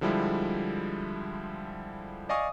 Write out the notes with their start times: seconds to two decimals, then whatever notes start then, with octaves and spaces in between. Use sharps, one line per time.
0.01 D3 F3 G3 G#3 E4
2.29 D5 D#5 F5 G#5 C#6 D#6